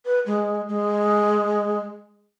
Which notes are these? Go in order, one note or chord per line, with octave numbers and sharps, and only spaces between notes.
B4
G#3
G#3